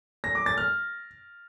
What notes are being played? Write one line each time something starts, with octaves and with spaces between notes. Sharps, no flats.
A#6
D6
A6
F6